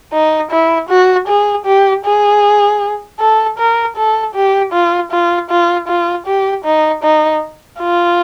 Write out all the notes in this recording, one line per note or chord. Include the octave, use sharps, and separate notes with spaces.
D#4
E4
F#4
G#4
G4
G#4
A4
A#4
A4
G4
F4
F4
F4
F4
G4
D#4
D#4
F4